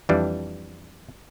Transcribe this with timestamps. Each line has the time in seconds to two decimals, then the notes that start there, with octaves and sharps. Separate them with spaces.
0.09 F2 E3 G3 D4